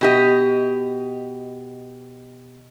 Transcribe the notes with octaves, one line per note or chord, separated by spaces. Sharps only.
B2 G4 D#5